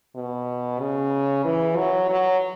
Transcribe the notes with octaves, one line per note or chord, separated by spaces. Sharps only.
B2
C#3
E3
F#3
F#3